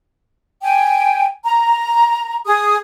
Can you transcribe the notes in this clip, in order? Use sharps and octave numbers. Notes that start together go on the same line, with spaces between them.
G5 G#5
A#5
G#4 D#6